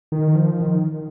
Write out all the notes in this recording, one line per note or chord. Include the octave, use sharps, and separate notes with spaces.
D#3
F3
D#3